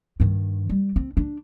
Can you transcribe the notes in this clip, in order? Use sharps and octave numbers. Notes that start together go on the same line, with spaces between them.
G2 D#3
G3
C4
D4